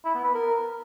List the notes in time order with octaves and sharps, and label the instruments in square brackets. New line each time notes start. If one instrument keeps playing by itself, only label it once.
[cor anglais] E4
B3
B4
A#4